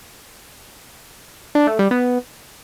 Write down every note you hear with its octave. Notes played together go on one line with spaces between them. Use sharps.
D4
A3
G3
B3